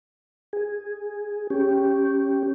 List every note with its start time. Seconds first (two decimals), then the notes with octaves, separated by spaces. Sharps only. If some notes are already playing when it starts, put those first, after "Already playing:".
0.53 G#4
1.50 C#4 G4